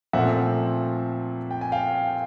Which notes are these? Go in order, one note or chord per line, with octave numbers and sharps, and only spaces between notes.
A#2 F3 A3 C4 E5 F#5
G5
G#5
F5 G5